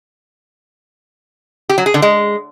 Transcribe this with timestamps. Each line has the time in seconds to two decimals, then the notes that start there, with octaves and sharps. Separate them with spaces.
1.69 G4
1.78 F#3
1.86 G#4
1.94 D3
2.02 G#3